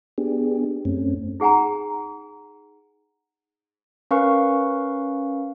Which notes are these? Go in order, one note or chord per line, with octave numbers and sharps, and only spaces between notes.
B3 D4 G4 G#4
F#2 A3 C4 C#4
D#4 G#4 F#5 G#5 A#5
C#4 A#4 B4 F5 C#6